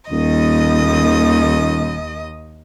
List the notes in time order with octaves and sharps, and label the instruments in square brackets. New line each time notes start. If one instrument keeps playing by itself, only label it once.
[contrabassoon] D#1 [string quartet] D#2 D#5 D#6